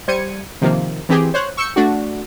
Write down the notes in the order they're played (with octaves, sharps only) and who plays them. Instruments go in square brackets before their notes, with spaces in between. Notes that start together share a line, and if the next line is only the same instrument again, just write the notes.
[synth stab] G3 C5 G#6 C#7 D#7
C3 D#3 F3 A#3
E3 C4 G4 G#4
C5 C#5 F#6
C#6 E6 G6 C#7
A3 D4 F#4